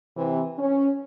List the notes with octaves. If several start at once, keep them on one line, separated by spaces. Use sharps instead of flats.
C3 E3
C#4